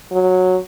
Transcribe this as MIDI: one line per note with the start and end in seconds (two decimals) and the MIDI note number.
0.11 0.58 54